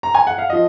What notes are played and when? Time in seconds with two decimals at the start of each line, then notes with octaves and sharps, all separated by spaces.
0.03 A#5
0.15 G#5
0.27 F#5
0.38 F5
0.50 F3 D#5